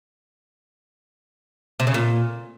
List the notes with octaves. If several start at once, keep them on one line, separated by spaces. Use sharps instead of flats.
C3
C#3
A#2